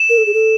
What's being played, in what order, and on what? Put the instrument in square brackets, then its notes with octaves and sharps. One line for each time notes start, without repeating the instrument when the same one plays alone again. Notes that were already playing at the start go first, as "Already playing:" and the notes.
Already playing: [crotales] E7
[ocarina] A#4
A4
G#4
A4